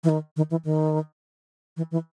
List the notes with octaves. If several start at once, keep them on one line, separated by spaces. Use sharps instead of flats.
E3
D#3
D#3
E3
D#3
E3
E3